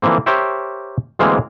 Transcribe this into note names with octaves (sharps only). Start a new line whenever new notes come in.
D3 E3 F3 A#3 C4
G4 A#4 C5 C#5 E5 G5
D2 E3 G#3 A#3 C4 F5